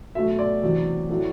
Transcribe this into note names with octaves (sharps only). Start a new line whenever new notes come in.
B2 F#3 A3 E5
D5
E2 C3 F#3
A2 F#3 A3